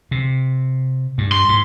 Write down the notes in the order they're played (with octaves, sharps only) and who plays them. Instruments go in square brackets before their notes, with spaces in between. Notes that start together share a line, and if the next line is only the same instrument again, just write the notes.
[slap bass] C3
G2
[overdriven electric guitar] C6
[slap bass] G#2